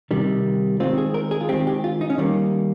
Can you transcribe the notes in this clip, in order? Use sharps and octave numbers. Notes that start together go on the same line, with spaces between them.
C3 D#3 G3
D#3 G#3 C4 F4
G#4
A#4
G#4
F4
D#3 G#3 C4 G4
G4
F4
D#4
C#4
D#3 G3 A#3 C4